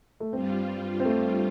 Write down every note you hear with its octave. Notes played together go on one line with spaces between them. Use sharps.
A3
G2 G3 C4 F4
C4
A3